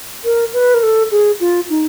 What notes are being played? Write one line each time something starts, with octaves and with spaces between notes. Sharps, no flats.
A#4
B4
A#4
A4
G#4
F4
D#4